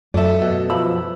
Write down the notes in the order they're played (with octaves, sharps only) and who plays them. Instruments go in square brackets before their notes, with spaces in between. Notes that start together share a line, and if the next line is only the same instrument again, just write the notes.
[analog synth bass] F#2 [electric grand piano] A3 A4 [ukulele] D5 E5
[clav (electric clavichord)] B2
[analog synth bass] F3 [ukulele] B5 [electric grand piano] E6